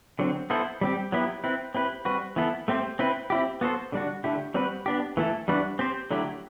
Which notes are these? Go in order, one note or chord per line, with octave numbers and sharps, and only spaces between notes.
D3 F#3 C4
B3 E4 A4 C5
G3 C4 G4
F#3 B3 E4 G4
C4 E4 B4
C4 E4 G4 B4
G3 C4 F#4 B4
E3 B3 E4 A4
A3 C4 G4 C5
C4 E4 B4
C4 E4 G4
B3 F#4 A4 C5
D3 G3 D4 F#4
D3 A3 E4 G4
G3 C4 F#4 B4
B3 D4 G4
E3 A3 E4 A4
E3 G3 D4 F#4 B4
C4 G4 C5
D3 F#3 A3 E4 G4